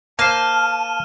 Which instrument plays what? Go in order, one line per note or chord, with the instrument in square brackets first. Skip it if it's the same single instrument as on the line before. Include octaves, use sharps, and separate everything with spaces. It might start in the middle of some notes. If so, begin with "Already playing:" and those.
[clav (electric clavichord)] A#3 C5 [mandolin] F5 [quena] A5 [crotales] F6 D#7 E7